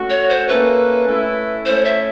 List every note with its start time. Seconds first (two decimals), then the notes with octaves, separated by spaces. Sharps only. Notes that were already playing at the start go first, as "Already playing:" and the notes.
Already playing: A3 C#4 F#4
0.10 C#5
0.30 C5
0.48 A#3 C#4 E4 A4 B4
1.07 A3 C#4 E4
1.65 A3 C#4 E4 C5
1.85 E5